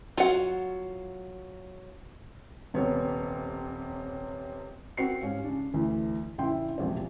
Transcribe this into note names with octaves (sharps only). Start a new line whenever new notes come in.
F#3 F4 F5 F#5
D#1 C3 B3 C#5
C4 F#4 A#4 F#5 C7 C#7
G#2 C#4 G4 F5
C#3 D4
D2 E3
A#1 F#2 D3 E4 G5 C6
E1 A#1 C3 F3 C5